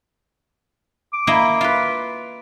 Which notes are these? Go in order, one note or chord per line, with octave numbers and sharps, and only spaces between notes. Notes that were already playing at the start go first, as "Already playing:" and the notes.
D6
A#3 E4 D#5
F4 B4